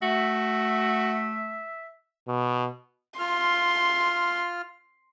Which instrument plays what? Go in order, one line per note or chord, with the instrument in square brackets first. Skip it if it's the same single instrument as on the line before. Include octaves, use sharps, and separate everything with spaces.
[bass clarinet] A3 [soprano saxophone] F#4 [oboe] E5
[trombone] B2
[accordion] F4 F6 [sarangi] C6